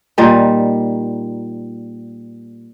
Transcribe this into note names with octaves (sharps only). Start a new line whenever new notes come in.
A#2 G3 D#4